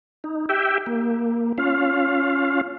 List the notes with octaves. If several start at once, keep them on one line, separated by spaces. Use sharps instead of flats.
D#4
G4 E5 G5
A#3
C#4 F4 F5